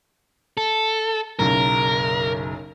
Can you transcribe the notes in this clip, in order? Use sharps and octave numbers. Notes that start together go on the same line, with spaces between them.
A4
F#1 B1 F#2 A#4